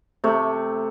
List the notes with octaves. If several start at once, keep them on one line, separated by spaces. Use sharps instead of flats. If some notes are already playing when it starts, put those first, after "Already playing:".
C3 A3